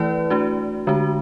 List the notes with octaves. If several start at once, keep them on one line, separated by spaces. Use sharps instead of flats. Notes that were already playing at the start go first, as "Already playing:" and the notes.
Already playing: E3 A3 E4 B4 D5
A3 D4 F#4
D3 G#3 D4 F#4